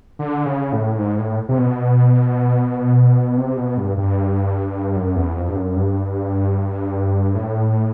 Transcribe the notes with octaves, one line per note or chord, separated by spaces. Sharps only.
D3
C#3
A2
G#2
A2
C3
B2
C3
B2
G2
G2
F#2
E2
F2
G2
F#2
G2
A2